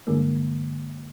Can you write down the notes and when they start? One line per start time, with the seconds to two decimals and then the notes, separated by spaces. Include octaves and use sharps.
0.07 G2 D3 E3 G#3 A#3